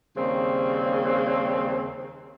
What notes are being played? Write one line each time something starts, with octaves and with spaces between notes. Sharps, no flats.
D#2 C#3 G3 C4